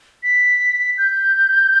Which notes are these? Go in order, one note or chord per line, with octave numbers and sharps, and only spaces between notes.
B6
G6